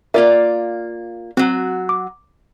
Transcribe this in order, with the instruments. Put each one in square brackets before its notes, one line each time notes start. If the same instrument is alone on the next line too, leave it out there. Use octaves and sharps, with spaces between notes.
[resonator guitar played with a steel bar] A#3 F4 D5 [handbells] A#4 E5
[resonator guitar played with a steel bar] F#3 F#4 [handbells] C4
[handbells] D6